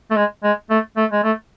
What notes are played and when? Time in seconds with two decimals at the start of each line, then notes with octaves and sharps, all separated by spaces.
0.11 A3
0.16 G#3
0.44 G#3
0.70 A3
0.97 A3
1.12 G#3
1.24 A3